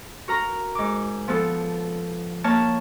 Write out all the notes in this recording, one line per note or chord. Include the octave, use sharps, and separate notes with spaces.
F#4 A#4 A#5
G#2 D6
F3 B3 A4
A#3 C#5 A5 F6